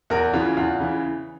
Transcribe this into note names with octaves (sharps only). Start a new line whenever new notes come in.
E2 A#4
C#3 E3 F4
E2 F4
C#3 E3